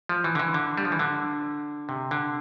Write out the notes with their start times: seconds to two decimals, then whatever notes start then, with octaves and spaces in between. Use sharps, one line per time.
0.09 F3
0.24 E3
0.35 D3
0.39 E3
0.54 D3
0.77 G3
0.85 F3
0.92 E3
0.99 D3
1.89 C3
2.11 D3